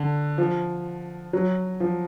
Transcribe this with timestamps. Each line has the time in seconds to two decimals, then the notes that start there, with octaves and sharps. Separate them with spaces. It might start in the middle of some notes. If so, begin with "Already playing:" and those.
Already playing: D3
0.38 F3
1.33 F#3
1.80 F3